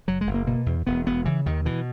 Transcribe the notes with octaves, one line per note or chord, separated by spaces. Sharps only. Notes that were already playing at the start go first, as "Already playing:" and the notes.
F#1 F#3
G#3
F#1
A#3
B2 A#3
E2
E1 B3
E1 B3
C#3 E3
D#2 D#3
B2 E3